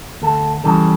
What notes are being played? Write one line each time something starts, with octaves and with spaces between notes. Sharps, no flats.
D2 A4
C#3 E3 G3 A4